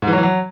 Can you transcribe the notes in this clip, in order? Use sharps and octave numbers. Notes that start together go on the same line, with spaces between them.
G#2
E3
F#3
E3
F#3